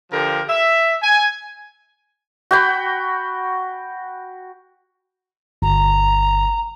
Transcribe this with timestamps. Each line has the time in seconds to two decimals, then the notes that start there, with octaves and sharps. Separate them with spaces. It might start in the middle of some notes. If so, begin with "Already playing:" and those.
0.11 D3 F3 G4 A#4
0.48 E5
1.02 G#5
2.51 F#4 G5 B5
5.62 G1 A#5